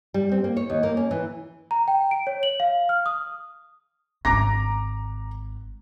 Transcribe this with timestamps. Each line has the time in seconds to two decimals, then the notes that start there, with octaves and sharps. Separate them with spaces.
0.14 G3
0.32 C4
0.44 A#3
0.57 C#5
0.70 D#2
0.83 A#3
0.97 C#4
1.11 E3
1.71 A#5
1.88 G5
2.11 D7
2.27 C#5
2.43 F#7
2.60 F5
2.89 F6
3.06 D#6
4.25 G#1 G#3 A#5 D6 A#6